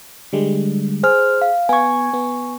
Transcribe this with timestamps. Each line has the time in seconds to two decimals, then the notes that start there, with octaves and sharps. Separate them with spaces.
0.33 D3 G3 G#3
1.03 G#4 C5 F6
1.42 F5
1.69 B3 G#5 C#6 G#6
2.14 B3